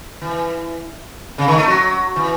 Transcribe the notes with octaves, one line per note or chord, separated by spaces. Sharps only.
E3
C#3
D#3
A3
F#3
E3